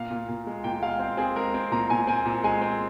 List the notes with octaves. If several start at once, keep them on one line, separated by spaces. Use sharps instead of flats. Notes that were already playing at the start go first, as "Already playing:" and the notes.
Already playing: A#2 F5
A#2
A#2
G#3
A#2 G5
G#3 F5
C4
C4 G#4
G#3 A#4
C4
A#2 A#5
A#2 G#5
C4 G#5
A#2
G#3 G#5
C4